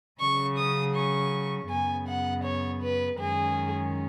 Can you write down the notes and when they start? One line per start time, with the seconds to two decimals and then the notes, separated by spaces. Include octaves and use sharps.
0.20 C#3 F#3 C#4 C#6
0.58 D#6
0.95 C#6
1.70 F#2 C#3 B3 G#5
2.08 F#5
2.44 C#5
2.82 B4
3.19 F#2 D#3 G#3 C#4 G#4